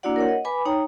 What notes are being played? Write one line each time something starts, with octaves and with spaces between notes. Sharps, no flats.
A#3 D4 E4 F#4 D5 F#5
A#4 C#5 F#5
D#5
B4 G#5 B5 D6
D#4 C#5 G5 A#5